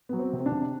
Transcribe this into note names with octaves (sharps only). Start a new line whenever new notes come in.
F#3 B3
C4
C3
C4
D4
C3